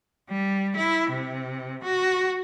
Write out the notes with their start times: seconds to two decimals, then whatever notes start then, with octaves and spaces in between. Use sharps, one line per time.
0.30 G3
0.77 E4
1.11 C3
1.84 F#4